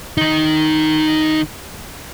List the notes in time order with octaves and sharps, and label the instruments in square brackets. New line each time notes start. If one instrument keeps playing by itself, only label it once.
[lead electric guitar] D#3 D#4